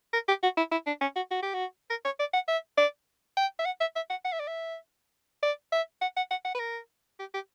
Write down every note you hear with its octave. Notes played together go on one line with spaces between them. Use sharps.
A#4
G4
F#4
E4
E4
D4
C#4
F#4
F#4
G4
F#4
A#4
C#5
D5
F#5
E5
D5
G5
E5
F#5
E5
E5
F#5
F#5
E5
D5
E5
D5
E5
F#5
F#5
F#5
F#5
B4
A#4
G4
G4